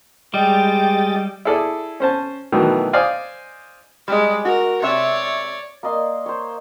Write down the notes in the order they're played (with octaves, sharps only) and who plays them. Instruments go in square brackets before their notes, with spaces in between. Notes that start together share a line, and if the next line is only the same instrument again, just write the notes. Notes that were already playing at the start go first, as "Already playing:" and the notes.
[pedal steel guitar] G3 [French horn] G#3 [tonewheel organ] G4 D#5 A6 [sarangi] G5
[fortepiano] E4 G#4 A4 D5
C#4 C5 A5
B2 D#3 E3 F#3 A3
C5 D5 D#5 F5 G#5
[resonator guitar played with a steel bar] G3 D#5 [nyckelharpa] G#3 D5
[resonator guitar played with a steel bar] F#4 [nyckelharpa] A#4
[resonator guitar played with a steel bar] C3 E5 [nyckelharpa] C#5 D5
[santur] A#3 D5 D#5 C6
C5 C#5